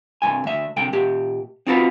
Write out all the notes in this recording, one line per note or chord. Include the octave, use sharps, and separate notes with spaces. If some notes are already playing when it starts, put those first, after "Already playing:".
C2 G2 G#5
D2 E5
C2 D3 G5
A#2 G4
C4 D#4 F4 F#4 B4